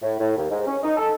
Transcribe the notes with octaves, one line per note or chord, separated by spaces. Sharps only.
A2
A2
D#2
G#2
C#4
D#4
A4